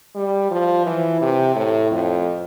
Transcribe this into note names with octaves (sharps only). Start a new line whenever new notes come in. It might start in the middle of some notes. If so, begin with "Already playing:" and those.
G3
F3
E3
C3
A2
F2